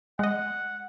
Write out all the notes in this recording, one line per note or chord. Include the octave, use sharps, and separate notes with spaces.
G#3 D#5 F#5